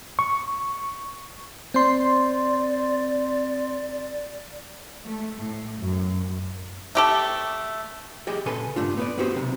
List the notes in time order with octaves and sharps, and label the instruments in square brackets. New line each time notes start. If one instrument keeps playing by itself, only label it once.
[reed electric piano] C#6
[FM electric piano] C4 C6 [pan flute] D5
[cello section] A3
A2
F#2
[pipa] A3 G4 A4
[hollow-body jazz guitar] G4 G#4 D#5 G5
A#2 C#3 A4 B4 G#5 C6
G2 A3 D4 F4
B3 B4 D5
B3 C4 F#4 G4 C5
B1 C3